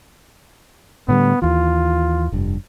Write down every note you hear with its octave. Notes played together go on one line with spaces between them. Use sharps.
A2 D3 G3 B3
D#2 E3 F4
F1 G2